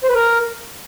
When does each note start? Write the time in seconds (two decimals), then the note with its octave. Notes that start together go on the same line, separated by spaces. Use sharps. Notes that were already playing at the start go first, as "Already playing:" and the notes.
0.04 C5
0.09 B4
0.15 A#4